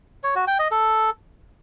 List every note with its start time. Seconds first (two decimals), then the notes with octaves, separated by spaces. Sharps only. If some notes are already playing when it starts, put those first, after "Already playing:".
0.24 C#5
0.35 F#4
0.47 G5
0.59 D#5
0.71 A4